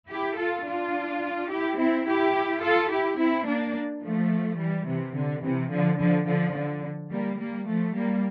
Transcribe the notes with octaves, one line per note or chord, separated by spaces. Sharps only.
E4 G4
F4 A4
D4 F4
E4 G4
C4 E4
E4 G4
F4 A4
E4 G4
C4 E4
A#3 D4
F3 A3
E3 G3
C3 E3
D3
C3 E3
D3 F3
D3 F3
D3 F3
D3
G3 A#3
G3 A#3
F3 A3
G3 A#3